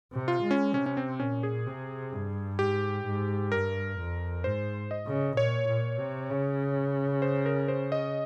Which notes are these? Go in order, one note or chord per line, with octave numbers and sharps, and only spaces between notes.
C3
F4
G#3
C#4
C3 C#4
C#4
C4
A#2 C#4
G#4
C3
G2
G#2 G4
G#2
G2 A#4
F2
G#2 C5
D#5
C#3
A#2 C#5
A#2
C3
C#3
C5
A#4
C5
D#5